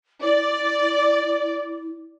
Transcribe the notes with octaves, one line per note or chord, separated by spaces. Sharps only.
E4 D5